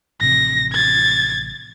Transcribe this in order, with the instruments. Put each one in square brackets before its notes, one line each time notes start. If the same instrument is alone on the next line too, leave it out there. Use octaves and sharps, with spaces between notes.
[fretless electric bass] A1 C3 F3 [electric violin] A#6
[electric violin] G#6 A6